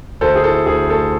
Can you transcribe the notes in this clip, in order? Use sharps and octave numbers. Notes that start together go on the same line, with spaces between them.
D2 A4 C5
G#4
E4 A4
D2 G#4
A3 A4